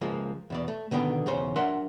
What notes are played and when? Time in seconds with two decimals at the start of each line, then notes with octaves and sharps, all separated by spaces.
0.01 C#2 F3 G#3 A#3
0.50 E2 B2 D5
0.68 A3
0.91 B2 D3 D#3 B3 G5
1.26 B1 E2 C#3 C#4 C5
1.56 F#3 D4 A#4 E5 F#5 C6